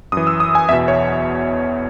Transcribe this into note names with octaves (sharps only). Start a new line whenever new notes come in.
F#2 E3 D#6
E6
D#6
G#5
E2 B2 E5
C#5